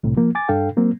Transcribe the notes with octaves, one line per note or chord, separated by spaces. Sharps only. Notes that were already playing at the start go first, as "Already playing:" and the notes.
C2 A2 C3
F3 A#3
G#5 D6 A6
G2 D4 A4 F5 G5
F#3 A#3 C4